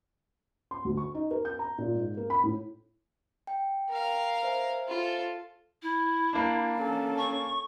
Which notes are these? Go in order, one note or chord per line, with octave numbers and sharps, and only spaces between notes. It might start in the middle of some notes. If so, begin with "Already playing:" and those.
C6
D2
C#6
D#4
A#4
G6
A#5
A#2
G#2
A#3
B5
A2
G5
A#4 F5
C5 E5 G#5
F4 A4
E4
A#3 D4
C#4 A4
C#6